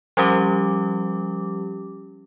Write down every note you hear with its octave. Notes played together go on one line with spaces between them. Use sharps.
F3 G3 C#4 G4 D6